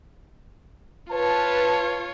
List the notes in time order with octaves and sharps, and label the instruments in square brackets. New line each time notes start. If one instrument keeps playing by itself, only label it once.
[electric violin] F4 C#5 [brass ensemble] B4 A5